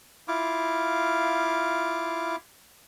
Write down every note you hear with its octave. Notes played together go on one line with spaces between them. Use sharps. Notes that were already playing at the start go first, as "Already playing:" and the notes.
E4 F4 F5 D6